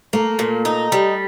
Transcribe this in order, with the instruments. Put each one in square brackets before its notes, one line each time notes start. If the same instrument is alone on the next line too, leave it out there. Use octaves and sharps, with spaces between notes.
[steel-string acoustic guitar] A3 [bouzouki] A#3
[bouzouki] A#2
D#4
G3